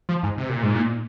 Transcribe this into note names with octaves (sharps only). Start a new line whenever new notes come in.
F3
G#2
C3
A#2
G#2
A#2